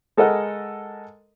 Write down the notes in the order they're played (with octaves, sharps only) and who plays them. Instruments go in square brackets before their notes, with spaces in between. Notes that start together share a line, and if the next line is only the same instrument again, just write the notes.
[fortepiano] G#3 A4 A#4 D#5 F#5